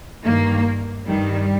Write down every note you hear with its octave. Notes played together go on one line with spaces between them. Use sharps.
G2 D#3 A#3
G2 D#3 G3